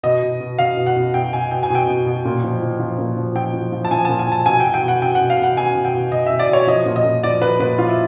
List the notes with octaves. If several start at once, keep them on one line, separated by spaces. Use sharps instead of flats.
B2 D#5
B2
B2
B2 F5
B2
F#5
B2
B2 G5
B2 G#5
B2 G5
G#5
B2 G5
B2
B2
A#2
F3
F3
F3
A#2
F3
F3 G5
F3
F3
A5
F3 G#5
A#2 A5
G#5
F3 A5
B2 G#5
G5
B2
G5
B2
F#5
B2 G5
F#5
B2
F5
B2 F#5
B2 G#5
B2
G5
B2
B2 D#5
B2 E5
D5
B2 C#5
F3 D#5
A#2
D#5
A#2
F3 D5
F3 B4
A#2 B4
F3 F4
E4